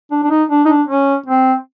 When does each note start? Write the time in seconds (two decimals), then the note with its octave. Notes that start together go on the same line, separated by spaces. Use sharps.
0.11 D4
0.23 D4
0.30 D#4
0.50 D4
0.65 D#4
0.69 D4
0.88 C#4
1.26 C4